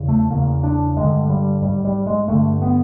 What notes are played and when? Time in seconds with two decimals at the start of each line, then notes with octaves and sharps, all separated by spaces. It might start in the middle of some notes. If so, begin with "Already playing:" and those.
Already playing: E2 C#3
0.08 A3
0.30 E2 C#3 A#3
0.63 D4
0.97 G2 D3 G#3
1.30 G3
1.62 G#2 G3
1.85 G3
2.06 G#3
2.28 G2 D3 A3
2.62 B3